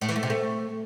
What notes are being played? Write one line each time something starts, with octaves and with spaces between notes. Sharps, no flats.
A2
E3
A3
C3
A3